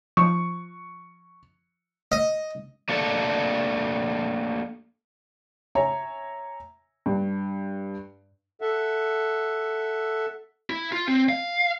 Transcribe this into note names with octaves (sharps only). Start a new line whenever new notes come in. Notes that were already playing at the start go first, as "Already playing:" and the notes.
F3 C#6
D#5
A3 A#3 D4 A4 E5 A5
C#5 E5 G#5 A#5
G2
A4 E5 F#5
E4
F4
C4
F5